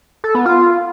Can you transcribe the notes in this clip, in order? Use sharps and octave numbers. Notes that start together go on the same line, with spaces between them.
A4
B3
F4